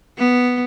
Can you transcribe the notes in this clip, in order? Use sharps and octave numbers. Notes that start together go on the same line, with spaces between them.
B3